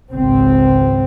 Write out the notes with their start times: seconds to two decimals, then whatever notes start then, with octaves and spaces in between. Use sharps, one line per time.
0.12 G#1 C#2 C4